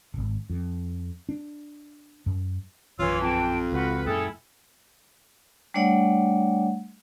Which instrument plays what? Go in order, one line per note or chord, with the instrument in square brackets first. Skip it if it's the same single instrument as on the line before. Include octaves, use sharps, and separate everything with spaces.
[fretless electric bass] D#1 G#1
F2
D4
F#2
[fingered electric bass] A#1 F#2 [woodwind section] E3 [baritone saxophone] F4 [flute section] C#5 E6
[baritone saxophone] F2 [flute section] G5 A5
[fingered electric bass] C#2 [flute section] F#4 [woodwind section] B4
[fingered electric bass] F#2 A#2 [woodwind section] C#4 G#4 A4 [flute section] E4 G5
[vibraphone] G3 A3 D4 C#5 D5 F#5